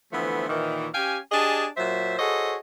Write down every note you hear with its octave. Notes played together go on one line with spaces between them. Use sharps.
D3 E3 F3 A3 B3 C4
A#2 D#3 E3
C#4 G4 F5 G5 G#5
D4 G4 G#4 D#5 G#5 A5
A#2 F#3 C5 E5
F#4 G#4 A4 C5 C#5 D#5